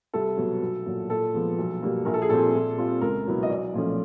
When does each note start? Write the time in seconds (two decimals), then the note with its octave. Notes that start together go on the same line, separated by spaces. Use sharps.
0.13 C2 A4
0.37 B2 F#3 B3
0.62 B1
0.86 A#2 F#3
1.10 A#2 A4
1.34 F3 G#3 B3
1.58 B1
1.82 B2 G3 A#3
2.05 A#1 A#4
2.14 A4
2.22 G#4
2.29 A#2 G3 C4 A4
2.54 A#2
2.77 G3 C4 F4
3.01 C#2 A#4
3.26 B2 F#3 B3 E4
3.43 D#5
3.49 B1 D5
3.74 A#2 F3 A3 C#4